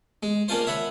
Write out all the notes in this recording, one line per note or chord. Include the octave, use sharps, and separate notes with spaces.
G#3
A#3 C#4 D4 F4 C5
C#5 E5 F#5 B5